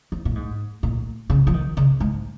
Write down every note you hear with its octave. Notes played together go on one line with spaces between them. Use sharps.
F3
A#2
G#2
A#2
C#3
F3
D#3
C#3
G#2